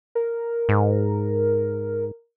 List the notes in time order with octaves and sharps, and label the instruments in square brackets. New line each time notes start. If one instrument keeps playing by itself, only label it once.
[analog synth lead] A#4
[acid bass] G#2